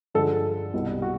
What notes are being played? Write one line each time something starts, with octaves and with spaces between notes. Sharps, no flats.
G2 D3 F3 G#3 A4
C2 B2 G3
F#4